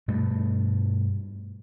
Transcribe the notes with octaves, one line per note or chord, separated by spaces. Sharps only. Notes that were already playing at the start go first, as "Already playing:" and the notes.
G2 B2 A3